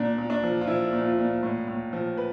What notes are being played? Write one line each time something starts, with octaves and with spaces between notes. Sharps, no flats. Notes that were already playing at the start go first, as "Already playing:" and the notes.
Already playing: A#2 D4
A#2
D4
F3
F4
F3 E4
A#2
F4
A#2
A2
A2
F3
B4